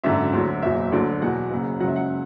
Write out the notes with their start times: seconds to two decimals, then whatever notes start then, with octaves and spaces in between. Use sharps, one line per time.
0.04 G#1 F#2 D3 E5
0.33 D2 D3 F#3
0.62 F#1 E2 B2 F#3 E5
0.92 D2 D3 F#3 D5
1.21 E2 B2 F#3 F#5
1.51 F#1 F#2 C#3
1.80 C#2 C#3 F#3 F#5
1.88 E5
1.96 F#5